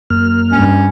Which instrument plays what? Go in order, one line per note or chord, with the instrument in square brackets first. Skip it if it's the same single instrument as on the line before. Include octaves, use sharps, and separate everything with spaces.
[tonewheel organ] F#2 A#3 F6
[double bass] G2 [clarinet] C#4